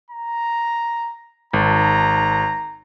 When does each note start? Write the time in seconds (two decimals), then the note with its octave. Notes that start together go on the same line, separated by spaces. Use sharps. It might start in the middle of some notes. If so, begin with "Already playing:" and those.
0.11 A#5
1.53 G#1 A#5